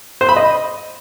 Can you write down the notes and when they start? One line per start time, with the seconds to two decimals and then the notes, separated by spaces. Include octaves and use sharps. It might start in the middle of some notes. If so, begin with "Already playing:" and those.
0.21 C5
0.29 B5
0.36 D#5